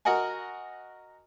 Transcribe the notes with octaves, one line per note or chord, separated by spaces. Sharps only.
F#4 A#4 D#5 F#5 G#5